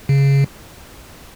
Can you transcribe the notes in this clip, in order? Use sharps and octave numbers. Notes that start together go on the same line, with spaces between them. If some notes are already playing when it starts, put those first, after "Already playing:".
C#3